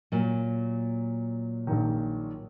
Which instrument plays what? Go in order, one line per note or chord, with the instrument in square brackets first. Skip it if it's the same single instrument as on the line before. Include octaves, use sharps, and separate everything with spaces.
[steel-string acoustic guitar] A#2 F#3
[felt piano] A#1 D#3